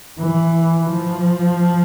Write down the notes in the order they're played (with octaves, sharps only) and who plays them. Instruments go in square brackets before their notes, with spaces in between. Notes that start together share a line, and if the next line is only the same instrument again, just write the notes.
[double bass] E3
F3